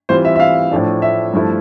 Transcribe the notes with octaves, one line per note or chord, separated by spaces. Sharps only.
E3 G3 C4 F4 C5
E5
E5
F5
A2 F3 A3 D4
E5
G2 F3 A3 E4